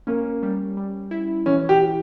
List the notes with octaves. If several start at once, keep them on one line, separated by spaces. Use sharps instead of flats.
A#3 C#4
G3
G3
E4
E3 C#4
G4